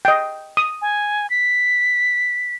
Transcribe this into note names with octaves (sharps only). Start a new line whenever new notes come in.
D#5 G5
D#6
G#5
B6